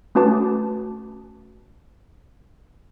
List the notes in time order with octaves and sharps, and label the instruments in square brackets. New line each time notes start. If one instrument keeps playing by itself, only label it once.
[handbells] A3 C#4 F#4 B4 A5 D6